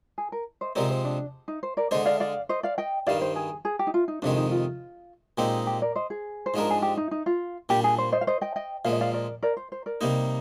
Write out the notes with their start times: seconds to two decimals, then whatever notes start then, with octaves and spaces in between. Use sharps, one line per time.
0.18 G#4
0.32 A#4
0.61 C5 D#5
0.76 C3 F3 G#3 C4 A#4 D5
0.90 C5
1.05 D4
1.48 D#4
1.63 C5
1.77 A#4 D5
1.91 D3 G#3 D4 C5 D#5
2.06 D5 F5
2.20 D5 F5
2.49 C5 D#5
2.63 D5 F5
2.78 D#5 G5
3.07 G2 D#3 G3 D5 F5
3.21 C5
3.36 G#4
3.65 G#4
3.79 G4
3.87 D#4
3.94 F4
4.08 D#4
4.22 F2 C3 D#3 G#3 D4
4.37 D#4
4.51 F4
5.38 A#2 G#3 C4 D#4 G4
5.67 G4
5.82 A#4 D5
5.95 C5 D#5
6.10 G#4
6.46 C5
6.54 G#2 F3 G#3 D4 A#4
6.70 G#4
6.82 G4
6.97 D#4
7.11 D#4
7.26 F4
7.69 A#2 G3 D4 G4
7.84 G#4
7.98 C5
8.12 C5 D#5
8.21 F5
8.27 C5 D#5
8.41 D#5 G5
8.56 D#5 G5
8.85 A#2 F3 G#3 F5
8.93 D#5
9.01 D5 F5
9.13 A#4 D5
9.43 A#4 D5
9.57 C5
9.72 C5
9.86 A#4 D5
10.01 C3 G3 A#3 D#4